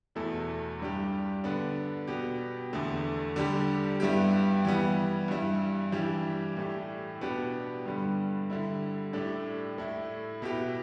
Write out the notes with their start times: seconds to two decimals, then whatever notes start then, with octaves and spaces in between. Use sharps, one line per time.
0.15 E2 B2 A3 E4 A4
0.80 G2 G3 D4 G4
1.44 D3 B3 D4
2.08 B2 B3 G4
2.73 E2 D3 A3
3.36 D3 G3 D4 G4
4.00 G2 G3 B3 E4 G4
4.65 E3 G3 B3
5.28 G2 G3 E4
5.92 E3 G3 D4 G4
6.57 A2 A3 G4
7.21 B2 B3 D4 G4
7.85 G2 D3 G3 B3
8.50 D3 G3 E4
9.13 A2 A3 D4 G4
9.78 A2 A3 E4
10.42 B2 B3 E4 G4